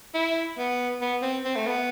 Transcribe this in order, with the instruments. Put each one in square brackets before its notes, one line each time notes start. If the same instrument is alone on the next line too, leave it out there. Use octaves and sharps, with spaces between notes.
[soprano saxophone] E4
B3
B3
C4
C4
A3
B3